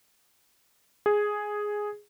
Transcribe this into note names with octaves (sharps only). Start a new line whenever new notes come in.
G#4